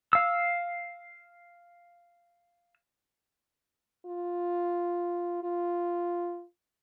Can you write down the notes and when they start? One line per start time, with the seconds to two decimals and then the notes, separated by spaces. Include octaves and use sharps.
0.13 F5 E6
4.05 F4
5.43 F4